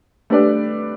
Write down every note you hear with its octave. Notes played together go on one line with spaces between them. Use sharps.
A3 D4 G4 B4 D5